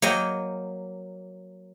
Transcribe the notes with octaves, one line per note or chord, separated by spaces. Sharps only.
F#3 A#3 D#5 G5